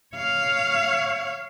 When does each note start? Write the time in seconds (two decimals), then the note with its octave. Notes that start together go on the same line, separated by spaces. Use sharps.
0.16 C#5 F5